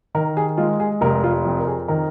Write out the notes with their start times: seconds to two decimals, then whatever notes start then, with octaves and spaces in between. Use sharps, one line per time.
0.15 D#3 A#4
0.37 G#4
0.57 G#3 F4
0.80 G#4
1.01 F1 A#4
1.24 F4
1.45 F2
1.58 A#4
1.67 G#4
1.88 D#3 A#4